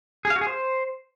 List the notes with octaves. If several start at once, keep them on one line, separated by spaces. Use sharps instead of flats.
G#4
F5
F#4
G#4
C5